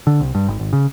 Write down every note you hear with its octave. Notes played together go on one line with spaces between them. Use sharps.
D3
C2
G2
G#1
G#1
C#3